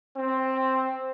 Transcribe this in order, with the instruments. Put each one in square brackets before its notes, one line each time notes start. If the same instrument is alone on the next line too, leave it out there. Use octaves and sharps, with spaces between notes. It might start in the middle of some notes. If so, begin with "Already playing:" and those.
[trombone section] C4